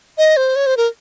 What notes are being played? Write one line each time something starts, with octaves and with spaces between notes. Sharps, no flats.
D#5
C5
C#5
C5
A#4